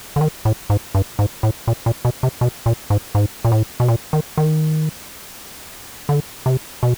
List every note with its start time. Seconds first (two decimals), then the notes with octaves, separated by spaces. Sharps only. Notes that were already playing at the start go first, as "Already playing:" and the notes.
0.16 D3
0.21 D#3
0.45 A2
0.70 G#2
0.95 G2
1.19 G#2
1.43 A2
1.68 A#2
1.86 A#2
2.05 B2
2.23 C3
2.41 B2
2.66 A#2
2.90 G#2
3.15 G#2
3.45 A#2
3.52 A2
3.80 B2
3.88 A#2
4.13 D#3
4.37 D#3
6.09 D3
6.46 C3
6.83 B2